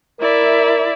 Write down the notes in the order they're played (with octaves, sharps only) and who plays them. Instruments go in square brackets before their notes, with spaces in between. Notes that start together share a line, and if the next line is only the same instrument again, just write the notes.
[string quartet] E4 D5 E5 [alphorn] A#4